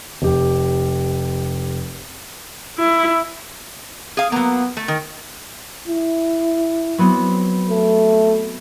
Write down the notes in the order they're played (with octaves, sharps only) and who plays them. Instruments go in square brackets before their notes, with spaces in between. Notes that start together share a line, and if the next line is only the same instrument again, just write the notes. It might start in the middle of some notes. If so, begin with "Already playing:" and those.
[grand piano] F1 G4
[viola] E4
[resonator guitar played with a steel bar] G#4 F5
[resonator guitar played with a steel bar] F#3 A#3 [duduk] B3
[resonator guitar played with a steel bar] A3
[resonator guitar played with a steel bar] D#3 [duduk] A#4
[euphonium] E4
[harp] F#3 B3 C4
[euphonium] A3